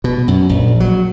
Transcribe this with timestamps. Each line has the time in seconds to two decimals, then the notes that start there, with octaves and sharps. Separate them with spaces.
0.04 B2
0.28 F#2
0.49 A#1
0.80 F#3